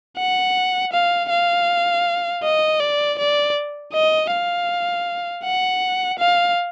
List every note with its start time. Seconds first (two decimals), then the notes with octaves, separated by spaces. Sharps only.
0.18 F#5
0.93 F5
1.30 F5
2.44 D#5
2.80 D5
3.19 D5
3.93 D#5
4.31 F5
5.44 F#5
6.19 F5